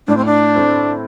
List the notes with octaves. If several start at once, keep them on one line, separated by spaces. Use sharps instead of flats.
A2 D4
C4
D4
A3 C4 E4